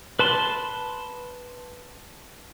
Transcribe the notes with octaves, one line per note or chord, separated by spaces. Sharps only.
B4 A5 C6